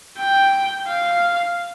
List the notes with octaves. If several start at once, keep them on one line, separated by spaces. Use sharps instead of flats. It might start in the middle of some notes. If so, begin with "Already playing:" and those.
G5
F5